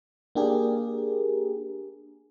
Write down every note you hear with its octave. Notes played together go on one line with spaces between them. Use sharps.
A#3 D4 G4 G#4 A#4